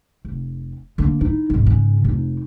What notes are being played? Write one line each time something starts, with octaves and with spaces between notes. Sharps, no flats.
F1
D3 A#3
D#4 E4
G#1 C#3
G#2 C#3
F1 D#4